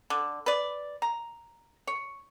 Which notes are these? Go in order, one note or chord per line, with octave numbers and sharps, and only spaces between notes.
D3
B4 D5
A#5
C#5